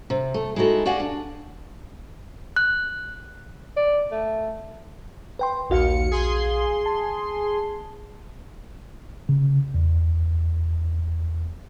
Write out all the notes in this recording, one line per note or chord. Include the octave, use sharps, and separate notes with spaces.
C3
A3
G#3 D#4 E4 F#4 A4
F#4 G4 D5 F5 F#5 G#5
D4
F#6
D5
A3
B4 G5 C6
A#1 D#2 F#4 F5 C#7
G#4 C6
A5
C#3
E2